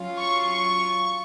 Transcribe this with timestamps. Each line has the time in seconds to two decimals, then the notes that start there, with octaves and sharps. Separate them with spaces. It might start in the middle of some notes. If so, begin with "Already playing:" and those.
Already playing: F#3 C#4 F4
0.18 C#6
0.49 C#6